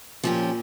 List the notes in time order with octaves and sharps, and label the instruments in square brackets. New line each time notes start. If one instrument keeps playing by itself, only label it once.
[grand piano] A#2 [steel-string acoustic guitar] F3 C#4 G4